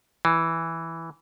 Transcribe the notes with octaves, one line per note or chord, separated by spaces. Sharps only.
E3